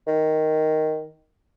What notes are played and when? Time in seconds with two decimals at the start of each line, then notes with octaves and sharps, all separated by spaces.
0.07 D#3